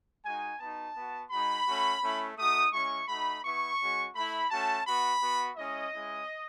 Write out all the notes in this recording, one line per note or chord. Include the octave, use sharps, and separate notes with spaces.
G#3 D#4 F#4 G#5
B3 D#4 F#4 A5
B3 F#4
G#3 D#4 F#4 B5
A3 C#4 F#4
A3 C#4 E4
A3 D#4 F#4 D#6
G#3 C#4 E4 C#6
A3 D#4 F#4 B5
B3 E4 C#6
G#3 C#4 F#4
A3 E4 B5
A3 C#4 F#4 A5
B3 F#4 B5
B3 F#4
G#3 C#4 E4 D#5
G#3 C#4 E4